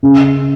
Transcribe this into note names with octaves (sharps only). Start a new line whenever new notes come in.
C#3